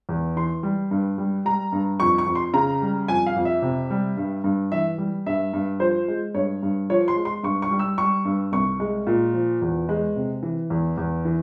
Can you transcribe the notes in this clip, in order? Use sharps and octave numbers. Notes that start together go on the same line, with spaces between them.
E2
E3 C6
G3
G2
G3
G3 A#5
G2
F2 C#6
C#6
F2
C6
C#3 A#5
G3
F2 G#5
F5
F2
E5
C3
G3
G2
G2
E3 E5
G3
G2 E5
G2
F3 C5
G#3
G2 C#5
G2
F3 C#5
C6
G#3
C6
G2 C#6
C#6
G3
E6
G3 C#6
G2
C2 C#6
G#3
A#2
F3
E2
G#3
C3
E3
E2
E2
E3